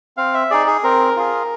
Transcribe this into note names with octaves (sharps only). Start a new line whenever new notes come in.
C4 F5
E5
D#4 G#4 D5
G#4
C4 A#4
F4 G#4